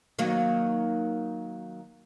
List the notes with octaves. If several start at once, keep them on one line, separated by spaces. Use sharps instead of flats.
D#3 F#3 A#3